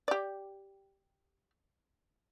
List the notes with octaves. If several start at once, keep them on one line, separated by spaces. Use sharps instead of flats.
G4 D5